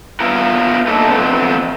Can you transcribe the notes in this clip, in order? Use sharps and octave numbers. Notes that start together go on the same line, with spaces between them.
B3 E4 F4 A#4
A3 A#3 D#4 A4
F2 A#2 E3 A3 B3 C4